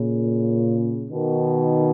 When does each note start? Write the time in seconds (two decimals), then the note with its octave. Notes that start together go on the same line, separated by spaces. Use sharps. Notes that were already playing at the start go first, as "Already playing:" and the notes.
Already playing: A#2 C#3
1.11 B2 D#3